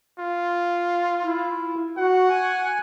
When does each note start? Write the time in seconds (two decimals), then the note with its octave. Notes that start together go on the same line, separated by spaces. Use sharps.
0.19 F4
1.24 E4
1.97 F#4 F#5
2.29 G#5